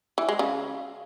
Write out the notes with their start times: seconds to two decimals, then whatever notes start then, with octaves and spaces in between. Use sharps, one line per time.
0.18 E3
0.29 G#3
0.39 C#3